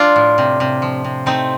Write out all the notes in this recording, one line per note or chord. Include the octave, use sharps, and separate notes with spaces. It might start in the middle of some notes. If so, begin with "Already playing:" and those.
Already playing: F3 D4 F4
A2
C3
C3
F3
C3
A3 C4 D#4